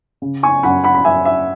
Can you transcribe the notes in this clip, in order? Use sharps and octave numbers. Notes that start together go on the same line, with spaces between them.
C#3
G#5 C#6
F#2 F#5 B5
F#5 B5
B5
F#2 E5 G#5
E5